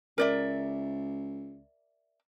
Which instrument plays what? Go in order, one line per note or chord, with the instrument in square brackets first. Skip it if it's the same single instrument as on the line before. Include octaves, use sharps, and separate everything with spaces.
[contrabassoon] C#2 [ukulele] A#4 D5 E5